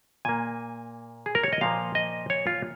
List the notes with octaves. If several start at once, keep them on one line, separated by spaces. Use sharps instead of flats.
A#2 A#3 G#5
G#4
A#4
C#5
D#5
A#2 F3 A#3 F5
D#5
C#5
F4